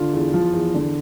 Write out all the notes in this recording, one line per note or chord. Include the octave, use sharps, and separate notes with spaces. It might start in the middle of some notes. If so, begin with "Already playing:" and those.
Already playing: D3 F4
E2
F3
E2
D3